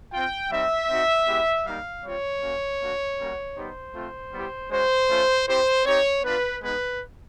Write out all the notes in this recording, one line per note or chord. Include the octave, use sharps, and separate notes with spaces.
C4 F4 G5
G3 C4 D#4 E5
C4 D#4 F#4
G#3 B3 E4 G4
G3 A#3 D#4 F5
G3 C4 F4 C#5
A#3 C#4 F#4
A#3 D4 F#4
G3 A#3 C#4 F#4
G3 B3 D#4 G4 C5
A3 C4 F4
G3 B3 E4 G4
G#3 C#4 F#4 C5
A3 C#4 F4
C4 E4 G4 C5
C4 D#4 G4 C#5
B3 D4 F4 B4
G#3 B3 D#4 B4